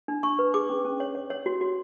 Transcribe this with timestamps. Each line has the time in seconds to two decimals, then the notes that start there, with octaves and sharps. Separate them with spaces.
0.08 D4
0.23 D4 C#6
0.39 B4
0.54 G#4 D6
0.70 C#4
0.85 C#4
1.00 C#5
1.15 C#5
1.30 C#5
1.46 F#4
1.61 F#4